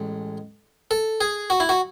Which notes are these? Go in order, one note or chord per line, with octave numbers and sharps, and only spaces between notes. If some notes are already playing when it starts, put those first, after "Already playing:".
Already playing: A1 G#3
A4
G#4
F#4
E4
F#4